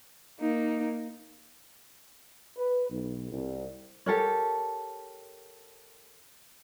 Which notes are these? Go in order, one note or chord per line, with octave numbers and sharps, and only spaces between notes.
A#3 D#4
B4
B1
C2
G4 A4 A#4 C#5